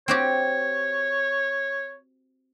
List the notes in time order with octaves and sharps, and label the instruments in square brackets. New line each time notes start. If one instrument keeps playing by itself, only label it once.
[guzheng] C4 F#4 G4 [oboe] C#5